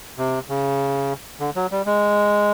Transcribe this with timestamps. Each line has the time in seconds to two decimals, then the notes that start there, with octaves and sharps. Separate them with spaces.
0.18 C3
0.49 C#3
1.40 D3
1.56 F#3
1.71 G3
1.86 G#3